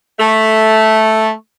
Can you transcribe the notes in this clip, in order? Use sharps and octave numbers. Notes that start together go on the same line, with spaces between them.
A3